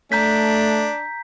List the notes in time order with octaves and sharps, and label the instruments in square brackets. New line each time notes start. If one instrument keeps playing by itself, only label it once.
[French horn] A3 [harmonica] D4 [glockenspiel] A#5 G6 B6